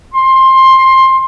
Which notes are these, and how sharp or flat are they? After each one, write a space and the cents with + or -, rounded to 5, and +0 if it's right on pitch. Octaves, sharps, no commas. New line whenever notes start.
C6 +15